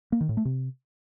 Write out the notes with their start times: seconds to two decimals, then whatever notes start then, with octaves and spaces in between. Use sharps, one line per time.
0.12 A#3
0.21 D#3
0.29 A2
0.37 A3
0.45 C3